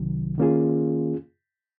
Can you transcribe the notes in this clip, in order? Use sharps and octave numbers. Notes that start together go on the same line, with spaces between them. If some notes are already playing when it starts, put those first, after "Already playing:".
Already playing: C2 C3 D#3 F#3
D#3 A#3 C#4 F4 G#4